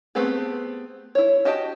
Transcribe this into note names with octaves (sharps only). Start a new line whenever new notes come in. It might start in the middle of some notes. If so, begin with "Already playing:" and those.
A3 B3 C4 G4 G#4
E4 C#5
F#4 G4 D#5 G5 A5